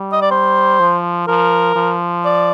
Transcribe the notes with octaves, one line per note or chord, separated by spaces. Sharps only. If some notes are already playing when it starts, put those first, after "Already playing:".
Already playing: G3
D#5
D5
C5
F3
F3 A#4
F3
D5